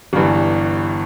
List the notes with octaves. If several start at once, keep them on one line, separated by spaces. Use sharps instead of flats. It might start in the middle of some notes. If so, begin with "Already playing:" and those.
G1 G2 E3